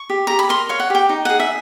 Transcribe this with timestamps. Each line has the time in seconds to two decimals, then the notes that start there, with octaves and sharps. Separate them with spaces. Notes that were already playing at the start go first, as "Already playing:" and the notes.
Already playing: C#6
0.10 G4
0.27 G4 A#5
0.39 B5
0.49 A#4 C6
0.69 C#5 F5
0.80 F#5
0.90 G4 G5
1.09 D#4
1.25 G#4 F#5
1.40 E5